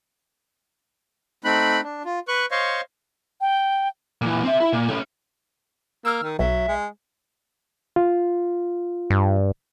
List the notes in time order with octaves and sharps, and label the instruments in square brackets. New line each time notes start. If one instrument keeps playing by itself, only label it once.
[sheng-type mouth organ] A3 C4 D#4 B5 F#6
D4
F4
B4 C#6 F#6
C5 C#5 D#5 F5 C6 C#6
[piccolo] G5
[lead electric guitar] A#2 E3
C4 E5
E4
A#2
A3 C#4
[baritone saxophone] A#3 [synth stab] E6 F6
[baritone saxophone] D#3
[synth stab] B1 [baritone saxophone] F#3 [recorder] E5
[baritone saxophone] G#3
[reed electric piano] F4
[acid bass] G2